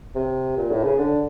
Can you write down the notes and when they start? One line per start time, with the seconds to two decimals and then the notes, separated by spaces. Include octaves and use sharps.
0.15 C3
0.57 A#2
0.71 A2
0.84 C#3
0.98 D3